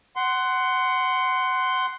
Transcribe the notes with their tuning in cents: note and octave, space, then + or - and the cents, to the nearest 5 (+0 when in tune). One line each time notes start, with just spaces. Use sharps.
F#5 +15 C6 -5